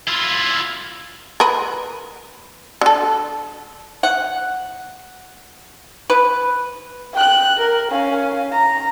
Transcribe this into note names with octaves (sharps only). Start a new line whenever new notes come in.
E4 F4
A#4 B4
D3 A4
F#5
B4
G5 F#6
A#4
C#4 F5
A#5